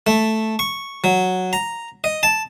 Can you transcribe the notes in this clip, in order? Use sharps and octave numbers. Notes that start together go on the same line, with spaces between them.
A3
C#6
F#3
A#5
D#5
A5